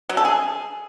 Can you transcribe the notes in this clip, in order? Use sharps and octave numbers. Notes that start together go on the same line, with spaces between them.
F#3
A4
G#4